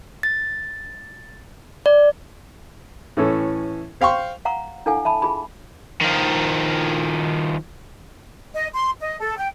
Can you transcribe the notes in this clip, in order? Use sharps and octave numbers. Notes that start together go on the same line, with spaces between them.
A6
D5
A2 E3 C#4 A4
C5 F5 G5 C6 C#6
F5 F#5 A#5 C#6
D4 E4 A4 F5 F#5 G#5
E5 A5 B5
F4 G#4 B5
D#3 F3
D#5
C6
D#5
A4
G5